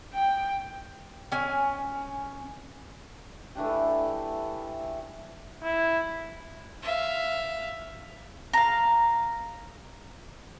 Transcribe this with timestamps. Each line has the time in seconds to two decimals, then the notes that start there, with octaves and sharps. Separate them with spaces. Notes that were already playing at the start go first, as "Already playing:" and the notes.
0.15 G5
1.32 C#4 G#5
3.55 E3 A3 D4 G4
5.63 E4
6.83 E5 F5
8.54 F5 A#5